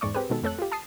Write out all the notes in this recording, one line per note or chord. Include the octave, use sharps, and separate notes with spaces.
E2 G#2 G#3 D5 C#6
C4 G4 G#4 B4
B2 D#3 G#3 A4
F2 A3 A4 C#5 F#6
F4 G4
A5 D#6 C7